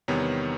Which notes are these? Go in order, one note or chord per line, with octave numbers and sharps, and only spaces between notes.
E2 C3 D#3 G3 B3 C#5